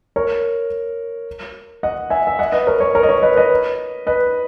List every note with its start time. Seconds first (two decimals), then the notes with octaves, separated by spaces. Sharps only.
0.16 A#4 C#5
1.83 D#5 F#5
2.10 E5 G#5
2.27 E5
2.39 D#5 F#5
2.52 B4 D#5
2.67 A#4 C#5
2.80 A#4 C#5
2.95 A#4 C#5
3.03 D#5
3.09 A#4 C#5
3.22 B4 D#5
3.36 B4 D#5
4.07 B4 D#5